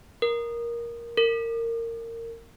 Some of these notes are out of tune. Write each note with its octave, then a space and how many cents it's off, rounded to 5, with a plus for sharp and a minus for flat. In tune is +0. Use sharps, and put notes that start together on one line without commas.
A#4 +10
A#4 -25